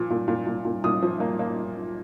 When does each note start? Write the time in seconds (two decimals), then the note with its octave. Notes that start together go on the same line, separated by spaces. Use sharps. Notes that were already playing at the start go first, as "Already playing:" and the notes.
Already playing: A#2 F3
0.10 A#2
0.28 A#2
0.47 A#2
0.65 A#2
0.84 A#2 D#6
1.02 F3
1.20 A#3
1.39 A#3